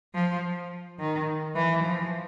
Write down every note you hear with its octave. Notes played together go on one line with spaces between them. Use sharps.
F3
D#3
E3
F3